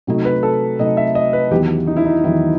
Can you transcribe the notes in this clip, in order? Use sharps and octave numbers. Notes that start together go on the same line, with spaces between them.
C3 F#3 A3 D#4
B4
A4
C3 F#3 A3 D#4 D#5
E5
D#5
B4
E2 D#3 F#3 B3 G4
D#4
E4
D#4
E2 D#3 F#3 B3 E4